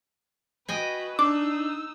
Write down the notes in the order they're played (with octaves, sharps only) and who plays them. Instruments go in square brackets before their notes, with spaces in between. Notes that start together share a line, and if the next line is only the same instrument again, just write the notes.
[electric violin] F#4 B4 [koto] D#5 G5 G#5
[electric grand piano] D4 [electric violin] D#4 E6 [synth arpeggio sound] D6